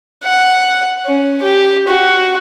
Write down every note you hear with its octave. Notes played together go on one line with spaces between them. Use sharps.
F#5
C#4
G4
F#4